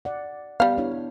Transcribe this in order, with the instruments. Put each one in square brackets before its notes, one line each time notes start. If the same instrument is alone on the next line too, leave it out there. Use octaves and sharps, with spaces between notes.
[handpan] D5 F#5
[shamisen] G3 F5 [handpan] B3
[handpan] D4 E4 C#5